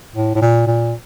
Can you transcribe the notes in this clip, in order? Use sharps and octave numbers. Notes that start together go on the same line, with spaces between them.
A2
A2
A#2
A#2